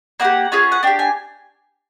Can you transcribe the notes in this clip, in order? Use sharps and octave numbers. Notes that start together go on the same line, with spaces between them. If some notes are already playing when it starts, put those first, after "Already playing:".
A#3 D#4 G4 F#5
C#4 F4 G#4
F#5
D4 G4 G5
G#5